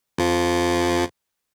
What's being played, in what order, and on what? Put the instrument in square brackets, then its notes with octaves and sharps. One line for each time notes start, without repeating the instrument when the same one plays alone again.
[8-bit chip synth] F2 F3